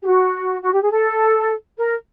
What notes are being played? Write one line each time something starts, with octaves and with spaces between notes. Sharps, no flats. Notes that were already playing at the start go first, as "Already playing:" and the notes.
G4
F#4
F#4
G4
G#4
A4
A#4